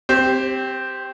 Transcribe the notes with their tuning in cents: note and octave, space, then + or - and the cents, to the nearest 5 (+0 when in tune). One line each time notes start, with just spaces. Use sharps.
C4 -10 G4 +0 C5 +35